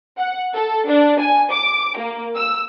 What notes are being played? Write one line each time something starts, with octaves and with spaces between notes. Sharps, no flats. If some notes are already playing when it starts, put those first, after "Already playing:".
F#5
A4
D4
G#5
D6
A#3
E6